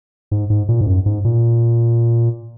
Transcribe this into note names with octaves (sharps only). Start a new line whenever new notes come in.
G#2
G#2
A#2
G#2
F#2
G#2
A#2